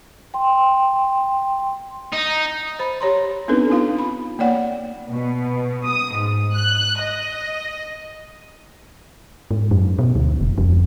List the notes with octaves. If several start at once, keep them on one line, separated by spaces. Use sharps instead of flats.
G5 C6
D#4
C5 B5
G4 C#5 A#5 C6
B3 C4 D4 D#4 A4 B4
B3 D#4 F4 F5
B5
A#3 C#5 D5 F#5 G5
B2
D#6
G#2
F#6
D#5
G#2
F#2
B2
D2
F1
F2